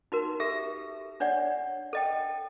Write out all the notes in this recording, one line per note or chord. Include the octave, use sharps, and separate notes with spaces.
D#4 F#4 A#4
G4 A4 E5
D4 C#5 D5 F#5
A4 D#5 G5